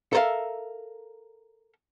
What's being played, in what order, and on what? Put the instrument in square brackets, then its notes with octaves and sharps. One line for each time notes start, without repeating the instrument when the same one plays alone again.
[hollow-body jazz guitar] A4 A#4 C5 E5 F5